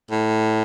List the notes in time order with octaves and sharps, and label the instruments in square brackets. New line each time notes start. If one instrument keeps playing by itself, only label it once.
[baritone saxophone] A2